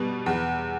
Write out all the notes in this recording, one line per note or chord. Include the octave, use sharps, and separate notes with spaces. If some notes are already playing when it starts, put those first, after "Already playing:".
Already playing: B2 G3 B4
E2